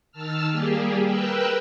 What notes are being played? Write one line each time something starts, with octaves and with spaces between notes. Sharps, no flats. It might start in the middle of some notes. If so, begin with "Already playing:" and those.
D#3 A5 E6 F6
G3 A#3 G4 G#4
A#4 B4 G5 E6 F#6